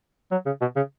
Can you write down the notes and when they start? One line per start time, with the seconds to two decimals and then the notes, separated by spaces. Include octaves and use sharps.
0.31 F#3
0.46 C#3
0.61 B2
0.76 C#3